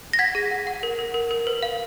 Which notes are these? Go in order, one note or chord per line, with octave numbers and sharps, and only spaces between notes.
A#6
F#5 G#6 B6
G#4
F#5
F#5
A#4
A#4
A#4
A#4
B4
F5